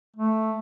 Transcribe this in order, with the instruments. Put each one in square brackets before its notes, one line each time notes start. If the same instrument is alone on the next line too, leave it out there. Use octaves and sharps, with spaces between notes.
[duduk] A3